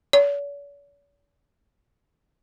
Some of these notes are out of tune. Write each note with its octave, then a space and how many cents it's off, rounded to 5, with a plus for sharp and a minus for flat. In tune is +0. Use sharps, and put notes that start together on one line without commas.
C#5 +45